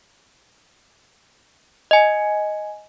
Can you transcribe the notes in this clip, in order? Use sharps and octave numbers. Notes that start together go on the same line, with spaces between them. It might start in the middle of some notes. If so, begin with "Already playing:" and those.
D#5 G#5